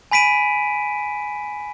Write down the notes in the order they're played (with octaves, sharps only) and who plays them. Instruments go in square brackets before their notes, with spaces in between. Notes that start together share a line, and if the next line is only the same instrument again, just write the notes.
[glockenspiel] G#5 B5 B6 D7 D#7